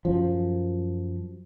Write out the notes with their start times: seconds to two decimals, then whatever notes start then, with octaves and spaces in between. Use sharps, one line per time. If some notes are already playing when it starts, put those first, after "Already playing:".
0.05 F#2 F3